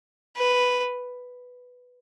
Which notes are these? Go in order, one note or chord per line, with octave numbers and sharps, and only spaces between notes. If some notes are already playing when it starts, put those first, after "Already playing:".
B4